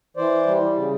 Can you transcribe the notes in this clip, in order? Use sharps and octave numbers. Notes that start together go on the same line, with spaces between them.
E3 C5 D5
G3
C#3